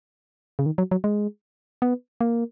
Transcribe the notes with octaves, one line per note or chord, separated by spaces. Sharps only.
C#3
D#3
F#3
F#3
G#3
B3
A#3